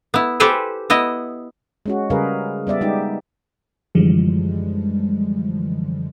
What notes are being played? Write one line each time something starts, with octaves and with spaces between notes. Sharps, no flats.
B3 E4
G4 A4 B4 C5 G5 G#5
B3 E4 D#5
G#3 C#4 F#4
C#3 G3 G#4 A#4 B4 F5
G3 B3 D5 E5
G3 G#3 D#4 G4
F#2 D3 E3 F3 G3 G#3